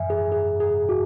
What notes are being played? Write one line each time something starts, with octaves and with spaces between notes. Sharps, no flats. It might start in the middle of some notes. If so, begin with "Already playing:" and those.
Already playing: F#2 E3 E5 G#5
G#4
G#4
G#4
F#4